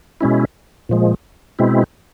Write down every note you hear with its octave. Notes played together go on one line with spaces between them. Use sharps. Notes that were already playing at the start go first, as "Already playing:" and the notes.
B2 G#3 C#4 E4
A#2 F3 G#3
B2 G#3 C4 E4